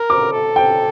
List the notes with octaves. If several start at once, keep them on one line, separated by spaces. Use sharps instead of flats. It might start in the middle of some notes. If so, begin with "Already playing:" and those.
Already playing: A#4
D6
A4
G5